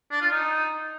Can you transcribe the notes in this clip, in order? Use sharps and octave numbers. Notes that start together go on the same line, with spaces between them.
D4
F4
D#4